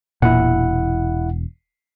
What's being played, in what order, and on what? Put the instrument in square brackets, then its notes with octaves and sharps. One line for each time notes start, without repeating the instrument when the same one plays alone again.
[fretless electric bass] E1 [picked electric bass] A#2 [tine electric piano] E4 F#5